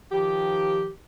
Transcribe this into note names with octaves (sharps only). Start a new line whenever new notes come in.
D#3 F3 G4